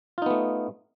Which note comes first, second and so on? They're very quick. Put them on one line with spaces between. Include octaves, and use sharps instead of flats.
F4 D#4 B3 A3